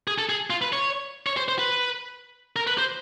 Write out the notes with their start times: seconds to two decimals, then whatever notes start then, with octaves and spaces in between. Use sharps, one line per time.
0.08 G#4
0.18 A4
0.29 G#4
0.50 F4
0.62 B4
0.73 C#5
1.27 C#5
1.37 C5
1.48 C5
1.59 B4
2.56 A#4
2.67 B4
2.78 C5